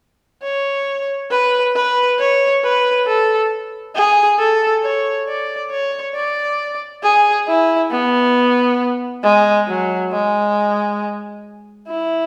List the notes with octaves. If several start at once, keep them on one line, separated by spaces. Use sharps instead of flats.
C#5
B4
B4
C#5
B4
A4
G#4
A4
C#5
D5
C#5
D5
G#4
E4
B3
G#3
F#3
G#3
E4